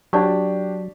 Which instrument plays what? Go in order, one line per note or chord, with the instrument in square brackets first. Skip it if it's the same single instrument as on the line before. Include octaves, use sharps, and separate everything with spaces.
[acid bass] F#3 [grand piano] D4 G4 [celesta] D5 A5 C#6